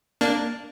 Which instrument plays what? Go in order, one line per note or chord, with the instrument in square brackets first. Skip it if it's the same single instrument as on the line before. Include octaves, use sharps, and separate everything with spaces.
[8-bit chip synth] A#3 D4